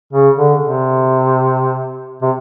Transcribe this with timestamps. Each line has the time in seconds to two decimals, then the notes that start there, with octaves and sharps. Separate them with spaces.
0.13 C#3
0.37 D3
0.61 C3
2.22 C3